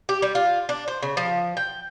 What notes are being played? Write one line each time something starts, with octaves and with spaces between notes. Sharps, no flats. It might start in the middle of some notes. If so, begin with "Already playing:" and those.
G4
G3
F4
D4
C5
C#3
F3
G5